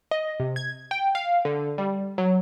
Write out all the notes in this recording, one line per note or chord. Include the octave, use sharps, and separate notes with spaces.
D#5
C3
G#6
G5
F5
D3
G3
F#3